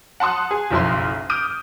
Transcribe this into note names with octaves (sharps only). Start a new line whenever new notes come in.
F#5 A5 C6 D#6 F#6
G#4
F#1 B1 F3 E4 C6
D6 D#6 F6 G6 D7 D#7